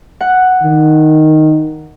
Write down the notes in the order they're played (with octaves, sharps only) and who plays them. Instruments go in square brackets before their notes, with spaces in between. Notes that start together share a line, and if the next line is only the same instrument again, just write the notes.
[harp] F#5
[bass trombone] D#3